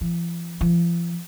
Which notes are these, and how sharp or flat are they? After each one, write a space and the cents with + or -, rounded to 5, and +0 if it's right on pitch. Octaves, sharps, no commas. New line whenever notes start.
F3 -45
F3 -40